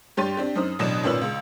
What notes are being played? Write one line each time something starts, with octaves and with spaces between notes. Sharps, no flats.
G2 G4 C#5 C6 A6 D#7
C4 D4 G4
F#2 D#4 C5 D#6
A1 B2 F#3 D4 D#6 E7
G#1 A#2 C#4 B4 E6 F#7
C#2